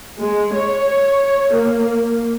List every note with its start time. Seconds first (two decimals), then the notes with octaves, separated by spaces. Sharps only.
0.20 G#3
0.55 C#5
1.54 A#3